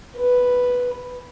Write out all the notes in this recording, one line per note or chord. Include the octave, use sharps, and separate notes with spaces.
B4